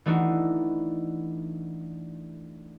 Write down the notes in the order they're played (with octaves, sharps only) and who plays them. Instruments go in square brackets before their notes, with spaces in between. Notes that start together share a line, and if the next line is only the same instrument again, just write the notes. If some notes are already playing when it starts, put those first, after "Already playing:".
[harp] E3 A3 D4 D#4 F#4